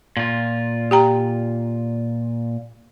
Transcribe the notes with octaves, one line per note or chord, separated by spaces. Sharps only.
A#2 F4
G4 G5 A#5